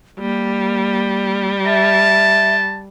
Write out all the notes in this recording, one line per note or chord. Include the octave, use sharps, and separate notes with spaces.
G3 A#3
E5 A5